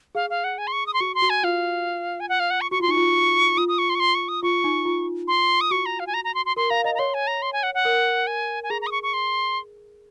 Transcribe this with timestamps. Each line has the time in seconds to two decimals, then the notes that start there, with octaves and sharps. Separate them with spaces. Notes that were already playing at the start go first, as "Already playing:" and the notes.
0.15 G#4 F5
0.30 F5
0.44 F#5
0.58 G#5
0.67 C6
0.72 C#6
0.86 D#6
0.94 C6
1.00 F#4 C#6
1.15 C6
1.22 F#4
1.30 G#5
1.43 F4 F5
2.20 G#5
2.29 F#5
2.40 F5
2.50 F#5
2.61 C#6
2.71 F#4 C#6
2.80 F4 C6
2.88 D#4 C#6
2.97 F4
3.57 F4 D#6
3.68 D#6
3.78 C#6
3.89 C6
3.95 C#6
4.00 C6
4.15 C#6
4.28 D#6
4.43 F4 C#6
4.64 D#4
4.85 F4
5.27 C6
5.61 D#6
5.71 F#4 C#6
5.86 A#5
5.99 F5
6.07 G#5
6.14 A#5
6.24 A#5
6.34 C6
6.46 C6
6.57 A#4 C6
6.70 F5 A#5
6.84 D#5 A#5
6.95 A#5
6.99 C#5 C6
7.14 G#5
7.27 A#5
7.42 C6
7.53 G#5
7.63 F#5
7.74 F#5
7.85 A#4
8.27 G#5
8.63 G#5
8.70 G#4 A#5
8.81 A#5
8.87 D#6
8.91 C#6
9.03 C#6
9.13 C6